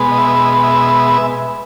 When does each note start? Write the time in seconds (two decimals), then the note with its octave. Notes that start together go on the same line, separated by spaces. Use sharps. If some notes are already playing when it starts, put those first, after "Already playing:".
Already playing: B2 G#3 B3
0.11 D#5
0.18 E5
0.63 E5